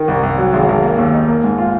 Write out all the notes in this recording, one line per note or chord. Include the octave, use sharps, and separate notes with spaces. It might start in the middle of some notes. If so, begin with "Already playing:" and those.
Already playing: D#3
C2
C2
F#3
G#1
G#1
A#3
D#2
D#4
A#3
G#2
F4